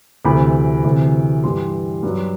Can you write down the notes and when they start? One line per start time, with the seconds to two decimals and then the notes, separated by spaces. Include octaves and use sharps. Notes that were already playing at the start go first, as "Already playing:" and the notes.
0.25 D2 C3 E3 B5
0.84 D2 C3 E3
1.43 G2 E3 G3 C6
2.03 G2 F#3